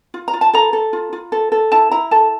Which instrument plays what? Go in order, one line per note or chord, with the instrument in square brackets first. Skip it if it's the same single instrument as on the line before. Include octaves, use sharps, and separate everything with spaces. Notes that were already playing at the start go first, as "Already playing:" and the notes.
[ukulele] F4
A#5
F4
A5
A4 A#5
A4
F4
F4
A4
A4
E4 A5
E4 A#5
A4 A5